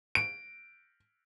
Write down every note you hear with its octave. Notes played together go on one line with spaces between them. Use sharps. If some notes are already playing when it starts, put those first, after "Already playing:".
D7